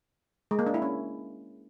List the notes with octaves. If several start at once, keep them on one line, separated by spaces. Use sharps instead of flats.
G#3
A#3
D4
E4
C#4